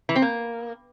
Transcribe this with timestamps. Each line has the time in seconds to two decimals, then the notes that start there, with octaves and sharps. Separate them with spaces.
0.09 E3
0.16 C4
0.22 A#3